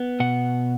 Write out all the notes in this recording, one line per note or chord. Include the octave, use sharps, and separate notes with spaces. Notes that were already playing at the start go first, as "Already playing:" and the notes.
Already playing: B3
B2 F#5